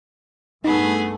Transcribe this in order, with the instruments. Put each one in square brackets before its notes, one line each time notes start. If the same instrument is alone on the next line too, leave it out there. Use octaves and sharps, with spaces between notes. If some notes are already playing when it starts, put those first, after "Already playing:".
[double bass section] G2 A3 [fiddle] B3 G#4 [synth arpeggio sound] D#4